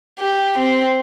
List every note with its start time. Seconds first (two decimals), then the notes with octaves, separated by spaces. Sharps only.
0.19 G4
0.59 C4